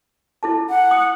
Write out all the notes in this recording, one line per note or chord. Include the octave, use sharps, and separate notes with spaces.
E4 A4 A5
F#5
D#6